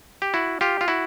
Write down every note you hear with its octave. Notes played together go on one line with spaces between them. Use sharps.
G4
E4 F#4
F4 G4
F4
E4 F#4